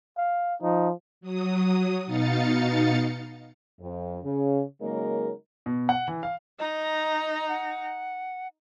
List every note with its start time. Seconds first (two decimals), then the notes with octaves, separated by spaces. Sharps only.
0.17 F5
0.62 F3 D#4
1.21 F#3 D#6
2.06 B2 D#4 F5 A6 C#7
3.81 F2
4.24 C#3
4.81 C#3 F#3 G#3 A#3 D#4 A#4
5.66 B2
5.89 F#5
6.08 E3
6.23 F5
6.59 D#4 D#5 A#5
7.49 F#5